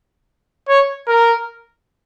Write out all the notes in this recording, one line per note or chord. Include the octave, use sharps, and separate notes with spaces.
C#5
A#4